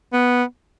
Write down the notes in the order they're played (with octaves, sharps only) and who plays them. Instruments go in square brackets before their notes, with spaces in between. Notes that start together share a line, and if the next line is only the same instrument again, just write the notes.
[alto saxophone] B3